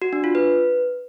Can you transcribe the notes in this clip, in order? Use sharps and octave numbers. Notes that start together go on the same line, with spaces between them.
F#4
D4
F4
B4